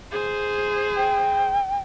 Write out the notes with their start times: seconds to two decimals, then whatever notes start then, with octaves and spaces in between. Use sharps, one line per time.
0.12 G#4 C5
0.97 G5